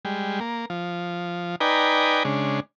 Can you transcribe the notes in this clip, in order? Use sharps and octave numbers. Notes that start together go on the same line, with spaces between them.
G3 G#3
A#3
F3
D#4 B4 D5 G5 G#5 A#5
C#3 G#3 D4